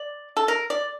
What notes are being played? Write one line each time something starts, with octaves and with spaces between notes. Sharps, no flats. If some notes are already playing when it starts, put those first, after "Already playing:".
Already playing: D5
A4
A#4
D5